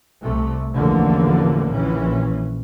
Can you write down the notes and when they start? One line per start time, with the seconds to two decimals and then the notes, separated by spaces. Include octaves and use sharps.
0.21 C2 C3 A3
0.73 A1 E2 A2 D3 F3 A#3
1.72 A#1 A#2 E3 C#4